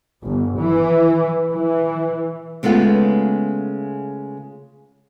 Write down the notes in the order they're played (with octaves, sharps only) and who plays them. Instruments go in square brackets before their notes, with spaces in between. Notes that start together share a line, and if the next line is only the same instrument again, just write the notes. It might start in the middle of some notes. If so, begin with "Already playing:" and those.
[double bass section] G1
E3
E3
[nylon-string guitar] C#3 G#3 A3 B3 F4